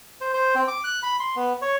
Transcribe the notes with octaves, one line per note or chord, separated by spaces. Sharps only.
C5
C5
C4
D6
F#6
B5
C6
B3
C#5